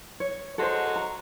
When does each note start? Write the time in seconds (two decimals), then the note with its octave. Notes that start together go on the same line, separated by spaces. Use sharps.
0.20 C#5
0.58 F#3 G#3 F#4 A4 C5
0.96 A#5